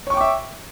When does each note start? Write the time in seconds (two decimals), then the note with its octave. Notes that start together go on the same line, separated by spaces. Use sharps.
0.07 C#5
0.10 C#6
0.14 G5
0.17 D6
0.21 E5